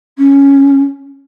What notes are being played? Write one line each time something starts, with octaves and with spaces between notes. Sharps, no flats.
C#4